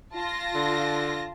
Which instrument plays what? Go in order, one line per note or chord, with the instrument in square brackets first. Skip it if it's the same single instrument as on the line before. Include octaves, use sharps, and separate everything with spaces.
[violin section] F4 A5 A#6
[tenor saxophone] D3